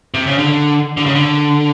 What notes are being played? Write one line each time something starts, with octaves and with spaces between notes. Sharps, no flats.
C3
C#3
D3
D3
C#3
D3